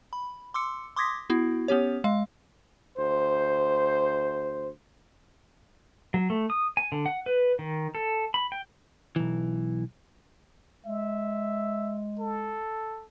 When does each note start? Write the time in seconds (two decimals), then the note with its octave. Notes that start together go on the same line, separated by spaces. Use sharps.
0.13 B5
0.54 C6 D6 E6 C#7
0.96 C6 D6 D#6 G#6 A#6 B6
1.30 B3 E4 F#4
1.68 B3 C#4 G4 C#5
2.04 G#3 F5
2.97 D2 C5
6.14 F#3
6.30 A3
6.50 D#6
6.77 G#5
6.92 D3
7.06 F#5
7.26 B4
7.59 D#3
7.95 A4
8.34 B5
8.52 G5
9.16 B1 E3
10.85 G#3 E5
12.19 A4